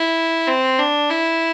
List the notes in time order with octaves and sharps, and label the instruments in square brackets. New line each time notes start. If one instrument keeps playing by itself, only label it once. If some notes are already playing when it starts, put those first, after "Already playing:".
Already playing: [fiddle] E4
C4
D4
E4